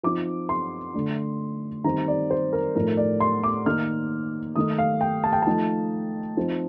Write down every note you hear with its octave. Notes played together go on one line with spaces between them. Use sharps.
F3 C4 D#4 D6
C6
D3 A3 D4
D#3 G3 C4 D#4 A#5
D5
C5
A#4
A2 F3 A3 D#4 A#4
D5
C6
D6
D#3 A#3 D#4 F6
D#3 A3 D#4 D#6
F5
G5
A5
G5
F3 A3 D#4 A5
F3 C4 D#4